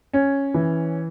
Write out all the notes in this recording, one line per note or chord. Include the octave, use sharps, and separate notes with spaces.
C#4
E3